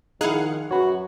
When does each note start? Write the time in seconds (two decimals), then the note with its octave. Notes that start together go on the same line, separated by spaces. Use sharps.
0.21 D#3 F3 D#4 E4 G#4 F5 F#5
0.71 F#2 F#4 B4 C#5